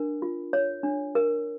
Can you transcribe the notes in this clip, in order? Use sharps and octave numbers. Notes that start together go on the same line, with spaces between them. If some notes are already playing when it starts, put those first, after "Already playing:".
Already playing: D4 A#4
F4
C#5
D4
A#4